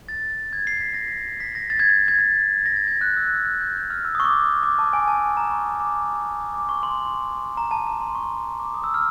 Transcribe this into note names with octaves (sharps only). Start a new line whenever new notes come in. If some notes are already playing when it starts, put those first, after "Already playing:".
A6
G#6
C7
B6
A#6
B6
B6
A#6
A6
G#6
G#6
G#6
A6
A#6
A6
G#6
F#6
E6
F#6
F6
F#6
G6
F#6
F6
E6
D#6
C#6
D6
D6
A5
G#5
A5
A#5
C#6
D6
D6
C#6
C6
A#5
A5
A#5
C6
C#6
D6
D#6
E6
F6